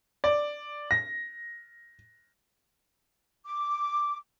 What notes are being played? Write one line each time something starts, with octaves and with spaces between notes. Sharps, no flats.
D5
A#6
D6